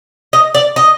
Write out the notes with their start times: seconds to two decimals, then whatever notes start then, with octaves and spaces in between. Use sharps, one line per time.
0.33 D#5
0.54 D5
0.76 D#5